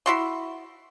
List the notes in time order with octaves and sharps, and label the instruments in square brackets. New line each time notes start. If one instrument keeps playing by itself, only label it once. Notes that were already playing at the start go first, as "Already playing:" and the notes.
[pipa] E4 F#4 C6